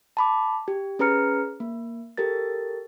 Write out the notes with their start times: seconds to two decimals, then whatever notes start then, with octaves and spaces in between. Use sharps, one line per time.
0.17 A5 B5 D6
0.68 G4
0.99 C#4 G#4 B4 A#5 F6 C#7
1.60 A#3
2.17 G4 A4 A#4 A6